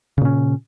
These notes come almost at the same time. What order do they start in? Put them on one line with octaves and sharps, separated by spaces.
C#3 A#2 C#4